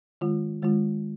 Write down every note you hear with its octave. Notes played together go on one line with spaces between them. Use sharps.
D#3 G#3 F4
D#3 G#3 F4